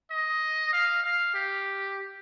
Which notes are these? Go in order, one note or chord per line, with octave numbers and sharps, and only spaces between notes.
D#5
F5
F5
G4